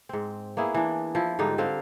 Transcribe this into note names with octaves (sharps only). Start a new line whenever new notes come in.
G#2 C4
A#3 B3 E4 G#4
E3 D4
F3 E4
G#2 D3 G3 D#4
D3 C4 F5